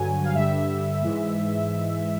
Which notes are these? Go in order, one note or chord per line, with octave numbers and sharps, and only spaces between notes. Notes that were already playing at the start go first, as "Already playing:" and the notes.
Already playing: G2 D3 F#3 G#5
F5
G2 D3 G3 E5
G#2 E3 G#3